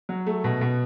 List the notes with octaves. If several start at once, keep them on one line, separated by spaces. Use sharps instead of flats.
F#3
A3
B2
B2